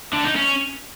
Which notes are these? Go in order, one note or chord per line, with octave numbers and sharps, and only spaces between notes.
D3
D#4
C#4